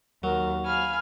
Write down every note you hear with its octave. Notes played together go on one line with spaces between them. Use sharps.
D#2 F#3 A#4
F5 G#5 B5 F6